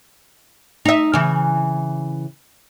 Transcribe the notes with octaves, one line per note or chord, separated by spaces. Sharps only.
D#4 E5
C#3 E3